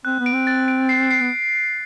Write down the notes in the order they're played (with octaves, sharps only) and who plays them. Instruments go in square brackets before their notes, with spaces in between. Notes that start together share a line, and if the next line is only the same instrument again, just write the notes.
[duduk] C4 [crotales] F#6
[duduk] B3
[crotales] D7
[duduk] C4
[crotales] A6
D7
C7
C7
[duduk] B3